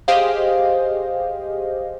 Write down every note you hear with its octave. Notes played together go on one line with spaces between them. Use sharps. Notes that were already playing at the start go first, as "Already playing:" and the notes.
G4 G#4 C5 D#5 F5